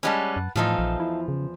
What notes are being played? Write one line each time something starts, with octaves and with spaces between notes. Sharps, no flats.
G3 G#3 C#4 B4 F#5 A5
F#2
E2 A2 F3 D#4 A4 F5
A#1
E4
C#3